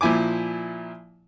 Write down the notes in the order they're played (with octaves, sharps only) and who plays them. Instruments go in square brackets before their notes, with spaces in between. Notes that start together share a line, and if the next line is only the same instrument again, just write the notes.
[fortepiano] A#2 F3 E4 G#5 D6